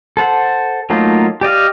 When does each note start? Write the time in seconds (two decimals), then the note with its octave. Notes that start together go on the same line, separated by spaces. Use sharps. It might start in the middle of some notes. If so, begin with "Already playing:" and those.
0.17 A4 C5 F#5
0.90 F#3 A3 A#3 D#4 F4
1.41 G4 D5 D#5 F5